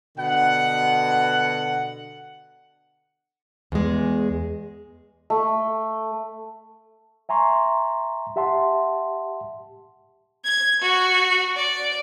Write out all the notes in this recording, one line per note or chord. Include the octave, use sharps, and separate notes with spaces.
B2 D3 F#5
E2 G#3
A3
E5 G#5 A#5 C6 C#6
G4 E5 F#5 A5 C6
G#6
F#4
D5